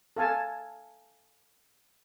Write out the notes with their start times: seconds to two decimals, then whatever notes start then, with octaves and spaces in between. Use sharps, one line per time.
0.16 A4 F5 G#5 A5